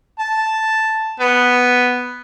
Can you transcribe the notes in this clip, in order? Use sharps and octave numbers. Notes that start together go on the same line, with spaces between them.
A5
B3